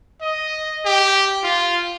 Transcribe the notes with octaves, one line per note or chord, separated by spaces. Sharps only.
D#5
G4
F4